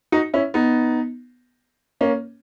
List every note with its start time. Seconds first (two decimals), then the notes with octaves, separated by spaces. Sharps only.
0.12 D#4 F#4
0.34 C#4 E4
0.54 B3 D#4
2.01 A#3 C#4